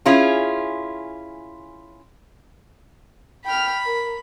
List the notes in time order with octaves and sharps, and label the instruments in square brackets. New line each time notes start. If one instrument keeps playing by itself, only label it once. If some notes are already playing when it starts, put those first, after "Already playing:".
[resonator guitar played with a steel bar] C#4 E4 F4 G#4
[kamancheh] G5 F6 [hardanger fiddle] B5
[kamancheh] A#4